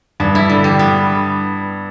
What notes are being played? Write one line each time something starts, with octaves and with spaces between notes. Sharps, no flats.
G2 B3
E4
D3
G3
B3